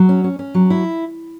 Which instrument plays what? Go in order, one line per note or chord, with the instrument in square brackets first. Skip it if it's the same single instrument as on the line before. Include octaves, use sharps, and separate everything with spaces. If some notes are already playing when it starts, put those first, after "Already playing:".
Already playing: [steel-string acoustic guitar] F#3
C#4
C#4
C#4
F#3
E4